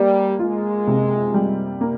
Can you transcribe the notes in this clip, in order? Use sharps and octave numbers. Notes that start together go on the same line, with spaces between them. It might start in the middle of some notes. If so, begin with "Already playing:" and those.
Already playing: G3 A#3
G#3 F4
C3
G3
A#3